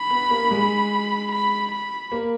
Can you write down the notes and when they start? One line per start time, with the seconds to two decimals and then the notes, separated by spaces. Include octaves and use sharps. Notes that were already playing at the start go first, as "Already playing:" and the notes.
Already playing: B5
0.10 B3
0.30 A#3
0.51 G#3
1.32 B5
1.72 B5
2.12 A#3